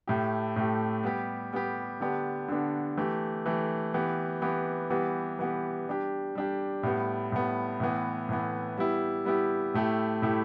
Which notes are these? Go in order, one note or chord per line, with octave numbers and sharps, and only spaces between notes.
A2 A3 G4
A2 A3 G4
G3 B3 G4
G3 B3 G4
D3 B3 D4 G4
D3 B3 D4 G4
E3 A3 G4
E3 A3 G4
E3 B3 G4
E3 B3 G4
E3 G3 B3 G4
E3 G3 B3 G4
G3 D4 G4
G3 D4 G4
A2 G3 B3
A2 G3 B3
A2 E3 B3
A2 E3 B3
G3 B3 E4 G4
G3 B3 E4 G4
A2 A3 E4 G4
A2 A3 E4 G4